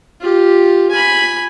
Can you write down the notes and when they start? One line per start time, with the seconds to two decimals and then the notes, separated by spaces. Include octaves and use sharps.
0.20 F4 G4
0.91 G#5 B5